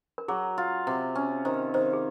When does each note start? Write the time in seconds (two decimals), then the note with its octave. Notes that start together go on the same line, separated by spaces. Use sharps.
0.18 A#4
0.28 F#3 G#4
0.58 F4
0.87 C3
1.15 C#4
1.45 D#3 C5
1.69 A#4
1.74 D#3 C5
1.93 G#4